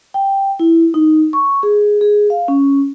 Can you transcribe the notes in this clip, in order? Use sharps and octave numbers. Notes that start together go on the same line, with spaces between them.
G5
E4
D#4
C#6
G#4
G#4
F5
C#4